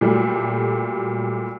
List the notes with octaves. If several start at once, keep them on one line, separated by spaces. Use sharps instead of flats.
A#2 F#3 G3 A3